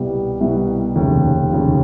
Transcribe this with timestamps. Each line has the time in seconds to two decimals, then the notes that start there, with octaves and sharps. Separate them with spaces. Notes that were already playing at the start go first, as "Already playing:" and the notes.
Already playing: C2 B2 G3 B3 E4
0.40 C2 B2 G3 B3 E4
0.95 F1 D#2 C#3
1.52 F1 D#2 C#3